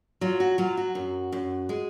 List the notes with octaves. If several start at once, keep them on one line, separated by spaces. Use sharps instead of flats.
F#3 F4
F#4
F#3 F4
F#4
F#2
F#2
G#3